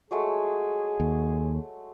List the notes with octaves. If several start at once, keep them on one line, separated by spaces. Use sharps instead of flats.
F#3 G#3 A3 G#4
D#2